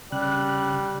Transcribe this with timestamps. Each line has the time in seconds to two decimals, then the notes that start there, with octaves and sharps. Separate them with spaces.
0.12 C#3 G3 F#6